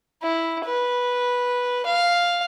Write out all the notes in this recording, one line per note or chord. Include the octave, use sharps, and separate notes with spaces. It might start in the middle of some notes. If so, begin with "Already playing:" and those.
E4
B4
F5